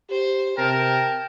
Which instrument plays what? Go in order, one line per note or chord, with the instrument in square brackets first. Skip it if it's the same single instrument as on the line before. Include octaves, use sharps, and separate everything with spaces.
[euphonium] G4 [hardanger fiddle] C5
[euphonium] C3 [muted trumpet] A#4 [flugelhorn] G5 [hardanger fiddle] A5